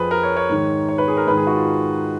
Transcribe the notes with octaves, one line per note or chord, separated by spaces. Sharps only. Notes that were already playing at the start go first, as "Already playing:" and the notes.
Already playing: F2 F3 G#4 B4
A#4
C#5
C#5
G#2 D#3
C#5
B4
G#4
A#4
G#2 D#3 B4
G#4
F#4
F4